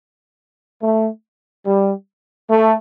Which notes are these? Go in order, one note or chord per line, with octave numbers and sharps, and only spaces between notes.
A3
G3
A3